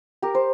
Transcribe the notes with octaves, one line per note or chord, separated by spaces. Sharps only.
G4 A#4
C5